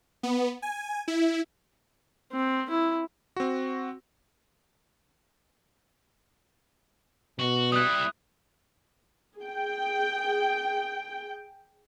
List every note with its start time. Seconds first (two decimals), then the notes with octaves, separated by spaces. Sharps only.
0.23 B3
0.62 G#5
1.08 E4
2.32 C4
2.70 E4
3.36 C4 F#4
7.39 B2 F#4
7.72 G3 E4 D#6 F#6
9.39 G#4 G5